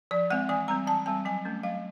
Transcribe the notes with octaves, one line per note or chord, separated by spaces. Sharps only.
F3 D5
G#3 C4 F#5
E3 G#5
G3 C4 A#5
E3 A5
G3 C4 A5
F#3 G#5
A3 C#4
F#3 F5